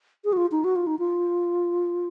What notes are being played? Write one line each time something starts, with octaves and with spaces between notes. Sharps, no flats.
G#4
F#4
F4
D#4
F#4
F4
D#4
F4